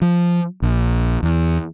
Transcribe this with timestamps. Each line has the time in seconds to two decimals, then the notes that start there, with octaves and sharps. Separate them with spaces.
0.02 F3
0.62 A#1
1.23 E2